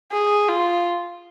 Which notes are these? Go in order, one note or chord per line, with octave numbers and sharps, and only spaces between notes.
G#4
F4